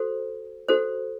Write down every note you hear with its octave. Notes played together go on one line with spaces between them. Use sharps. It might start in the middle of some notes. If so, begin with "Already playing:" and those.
Already playing: F#4 A4 C5
F#4 A4 C5